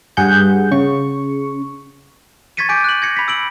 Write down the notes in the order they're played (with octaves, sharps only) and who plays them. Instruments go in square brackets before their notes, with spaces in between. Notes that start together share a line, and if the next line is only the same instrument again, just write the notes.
[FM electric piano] G2 G#4 F#5 G6
C#3 C#6
[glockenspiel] C#6 G#6 A6 B6 C#7 D#7
G#5 D6 G6 B6 D7
F#6 F#7
G#6 A#6 C#7
B5 B6
E6 D7 F#7